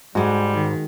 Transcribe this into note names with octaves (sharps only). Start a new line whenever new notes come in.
G#2 G3 G#3 F#4
D#3